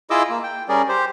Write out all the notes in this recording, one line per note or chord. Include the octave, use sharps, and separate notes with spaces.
E4 F4 G#4 D#5 D6 E6
A#3
G5
G3 C#4 G#4 A#4 D5
G4 C5